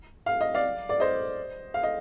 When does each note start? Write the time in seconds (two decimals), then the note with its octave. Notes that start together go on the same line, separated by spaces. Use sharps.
0.26 F5
0.41 D#5
0.54 D5 F5
0.89 D5
1.00 C5 D#5
1.74 F5
1.83 D#5